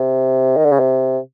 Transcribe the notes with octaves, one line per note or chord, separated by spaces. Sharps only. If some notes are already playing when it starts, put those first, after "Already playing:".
Already playing: C3
D#3
D3
C#3
C3